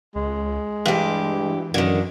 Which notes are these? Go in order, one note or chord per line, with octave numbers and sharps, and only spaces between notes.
C#2 G#3
G2 E3 G4
F#2 D3 D#3